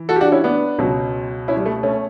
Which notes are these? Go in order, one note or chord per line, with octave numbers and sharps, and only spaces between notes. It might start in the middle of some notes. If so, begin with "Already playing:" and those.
Already playing: E3
F#4 A4
G4
D4 F#4
C#4 E4
B3 D4
C#2 B2 F#3
C#4 E4
G3
A3
A3 C#4